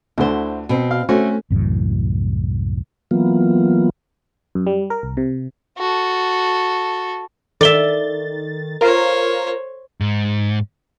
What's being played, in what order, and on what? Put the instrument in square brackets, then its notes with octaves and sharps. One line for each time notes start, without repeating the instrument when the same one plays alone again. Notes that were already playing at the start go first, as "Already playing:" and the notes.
[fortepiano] D2 D3 [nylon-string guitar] E4 C5
[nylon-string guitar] B2 C4
[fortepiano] F5
[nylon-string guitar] A3 [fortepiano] C4 C#4 F#4
[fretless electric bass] C2 F#2 A2 E3
[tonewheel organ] E3 F#3 A#3 B3 F4
[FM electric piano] F#2
G3
A#4
C2
C3
[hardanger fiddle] F#4 A4
[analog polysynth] D#3 A6 [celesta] A4 G7 [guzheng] D5 E5
[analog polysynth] F4 A#4 [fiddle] C5 C#5
[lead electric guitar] G#2